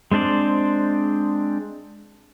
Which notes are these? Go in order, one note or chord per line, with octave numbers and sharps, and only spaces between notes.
G#3 C4 D4 C5 D5